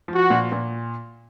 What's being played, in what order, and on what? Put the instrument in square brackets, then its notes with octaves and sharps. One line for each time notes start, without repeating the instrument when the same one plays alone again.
[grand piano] F3
[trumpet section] F#4
[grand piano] A#2
A#2